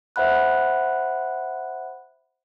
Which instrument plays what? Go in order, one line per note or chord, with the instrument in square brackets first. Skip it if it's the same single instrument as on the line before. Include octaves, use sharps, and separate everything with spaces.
[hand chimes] C5 E5 F#5 B5 F#6